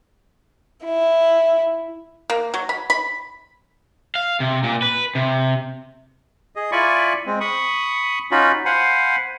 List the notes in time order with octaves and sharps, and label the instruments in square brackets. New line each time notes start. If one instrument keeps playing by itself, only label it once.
[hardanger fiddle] E4
[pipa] A#3
F#3
B5
B5
[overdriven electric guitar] F5
C3
A#2
B4
C3
[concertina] G#4 D#5
E4 F4 D5 G#5 B5 C#6
G#3 C4
B5 C#6 D#6
C#4 D#4 F4 F#4 B5
C5 F5 F#5 G#5 B5